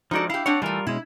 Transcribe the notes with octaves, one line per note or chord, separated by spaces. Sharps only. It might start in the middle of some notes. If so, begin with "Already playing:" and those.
F3 G#3 D#4 F#4 A4 D5
E4 G4 F5
C4 D4 C#5 F#5
E3 G3 A3 F4 A#4
B2 G#3 C#4 E4